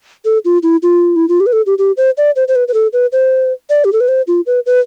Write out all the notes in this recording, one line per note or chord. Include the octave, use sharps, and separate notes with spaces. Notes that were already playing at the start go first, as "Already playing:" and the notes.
A4
F4
E4
F4
E4
F4
G4
B4
A4
G4
G4
C5
D5
C5
C5
B4
B4
A4
B4
C5
D5
G4
A4
B4
C5
F4
B4
B4